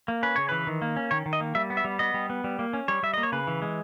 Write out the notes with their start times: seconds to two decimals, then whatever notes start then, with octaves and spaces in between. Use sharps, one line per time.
0.08 A#3
0.23 C#4 B4
0.36 C#3 C#5
0.49 E3 B4
0.67 D#3
0.82 A#3
0.96 C#4
1.11 D#3 C#5
1.26 D#3
1.33 D#5
1.40 A#3
1.55 G3 E5
1.70 B3
1.77 E5
1.85 G3
1.99 B3 D#5
2.14 G3
2.30 B3
2.44 G3
2.59 A#3
2.73 C#4
2.88 G3 C#5
3.03 G3 E5
3.14 A#3 D#5
3.23 C#5
3.32 C#3 B4
3.47 E3
3.62 G#3